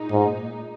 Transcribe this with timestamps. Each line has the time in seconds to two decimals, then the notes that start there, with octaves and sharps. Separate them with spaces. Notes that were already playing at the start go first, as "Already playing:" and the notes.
Already playing: A#2 G#3 D#4
0.11 G#2